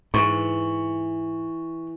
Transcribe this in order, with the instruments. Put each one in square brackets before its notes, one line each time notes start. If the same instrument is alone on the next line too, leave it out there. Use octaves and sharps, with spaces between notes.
[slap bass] G#2 [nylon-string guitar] E3 [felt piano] C#6